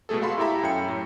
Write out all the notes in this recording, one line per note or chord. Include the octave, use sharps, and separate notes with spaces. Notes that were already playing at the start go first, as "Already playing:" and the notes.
B2 G#3 A3 G#4 A4
F#4 A4 F5 B5 C6
E4 G4 A4 E5 A#5 B5
F#2 G5 C#7
A2